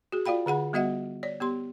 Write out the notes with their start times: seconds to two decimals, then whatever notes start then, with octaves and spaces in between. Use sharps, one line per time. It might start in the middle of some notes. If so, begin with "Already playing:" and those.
0.12 F#4 G#4
0.26 F4 D5 F5 G5 B5
0.46 D3 G#4 F#5 B5
0.73 G3 B3 F#4 D#5 E5 F#5
1.23 C#5 D5
1.40 B3 G4 C6